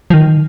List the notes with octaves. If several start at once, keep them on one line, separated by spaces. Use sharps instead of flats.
F3
D#3